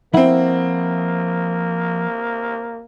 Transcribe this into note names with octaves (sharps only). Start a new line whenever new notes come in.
F3 A#3 C4 E4 F#5